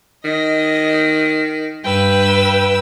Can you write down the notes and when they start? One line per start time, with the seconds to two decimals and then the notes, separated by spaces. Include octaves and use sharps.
0.25 D#3 D#5
1.84 G2 B4 G5 E6